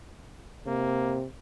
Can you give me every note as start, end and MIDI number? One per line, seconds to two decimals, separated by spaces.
0.67 1.25 48
0.67 1.20 58